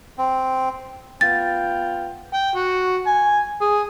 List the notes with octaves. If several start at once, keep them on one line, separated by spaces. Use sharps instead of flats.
C4
B3 F4 G5 A6
G5
F#4
G#5
G#4